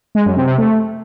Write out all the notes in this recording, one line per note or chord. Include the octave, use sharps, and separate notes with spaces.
G#3
F#2
C3
C3
A3